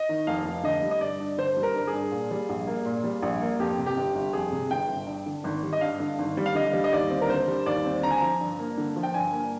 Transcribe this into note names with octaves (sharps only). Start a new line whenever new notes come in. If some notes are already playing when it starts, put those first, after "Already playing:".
Already playing: D#5
D#3
F1 F5
F1
D3 D#5
G3
D#5
G2 D5
G2
D3 C5
G3
A#4
G2
G#4
G2
A#2
G3
A#1
A#3
A#2
G3
A#1
A#3
F2 G4
C3
G4
G1
G1
F2 G#4
C3
G1 G5
G1
G2
D3
G#1
G3
D#5
G2 F5
D3
G#1
G3
F5
D3 D#5
G3
D#5
D#2 D5
C4
A#4
D3 C5
G3
D#2 D5
C4
D3 A#5
G#5
F3 A#5
G2
A#3
D3
F3
G5
G2 G#5
A#3